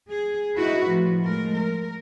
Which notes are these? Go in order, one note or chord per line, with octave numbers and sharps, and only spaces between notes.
G#4
D#4 E4 F#4 B4
A2 F3
F3 G#3 A3 A#4
A#4